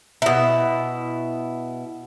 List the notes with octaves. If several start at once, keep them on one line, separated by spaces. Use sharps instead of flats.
B2 E4